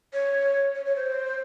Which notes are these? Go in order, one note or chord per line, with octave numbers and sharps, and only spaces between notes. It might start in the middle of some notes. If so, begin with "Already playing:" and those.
C#5
C#5
C#5
C5